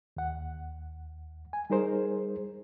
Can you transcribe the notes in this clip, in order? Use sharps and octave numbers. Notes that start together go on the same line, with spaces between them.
D#2 F#5
G#5
G3 D#4 G#4 A#4 C5